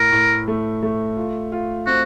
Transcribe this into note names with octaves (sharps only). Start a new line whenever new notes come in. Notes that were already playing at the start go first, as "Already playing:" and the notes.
Already playing: A2 A#4
A2
A3
A3
F4
F4
C4 F#4